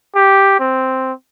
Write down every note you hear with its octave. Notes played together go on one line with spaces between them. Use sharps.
G4
C4